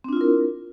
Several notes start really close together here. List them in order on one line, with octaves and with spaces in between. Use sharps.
C4 D4 F4 E4 A#4